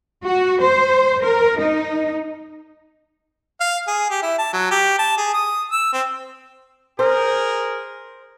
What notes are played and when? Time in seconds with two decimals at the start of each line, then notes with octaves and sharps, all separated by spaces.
0.24 F#4
0.61 C5
1.23 A#4
1.59 D#4
3.61 F5
3.88 G#4
4.10 G4
4.23 E4
4.39 A5
4.53 F#3
4.71 G4
4.99 A5
5.17 G#4
5.34 D#6
5.72 E6
5.93 C4
6.99 G#4 A#4 C5